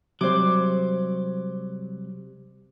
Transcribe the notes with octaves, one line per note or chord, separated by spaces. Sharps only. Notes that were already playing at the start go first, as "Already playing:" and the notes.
C3 F#3 G3 C5 D6